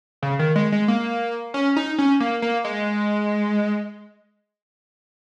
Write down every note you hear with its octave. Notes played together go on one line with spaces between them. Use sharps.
C#3
D#3
G#3
G#3
A#3
C#4
D#4
C#4
A#3
A#3
G#3